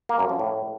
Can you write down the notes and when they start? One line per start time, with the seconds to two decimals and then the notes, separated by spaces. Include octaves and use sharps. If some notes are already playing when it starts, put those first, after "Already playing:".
0.09 A#3
0.19 F#2
0.29 F3
0.39 A2